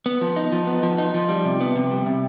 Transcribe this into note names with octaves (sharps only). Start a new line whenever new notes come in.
B3
F3
D#4
F3
B3
F3
D#4
F3
G3
C3
B3
C3
G3
C3